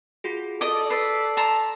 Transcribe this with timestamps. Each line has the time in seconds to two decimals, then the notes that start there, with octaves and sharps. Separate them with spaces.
0.24 F4 F#4 G#4
0.61 A4 D5 D#5 D6
0.90 B4 E6 A6 C7
1.37 A5 A#5 C6